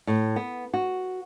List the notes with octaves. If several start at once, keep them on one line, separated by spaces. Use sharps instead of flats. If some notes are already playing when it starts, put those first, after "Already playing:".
A2
B3
F#4